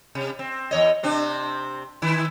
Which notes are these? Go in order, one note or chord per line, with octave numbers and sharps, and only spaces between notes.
C3
C4
E2 C#5 D#5
C3 C4 D4
D#3 E4